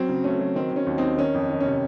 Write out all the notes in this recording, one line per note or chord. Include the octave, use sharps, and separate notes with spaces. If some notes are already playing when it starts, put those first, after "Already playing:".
Already playing: F#3 C4
C#3
A3 C#4
F#3
D#3 C4
D#3 C#4
D#2
D#2 C4 D#4
D#3 C#4
F2
D#3
C#4
C3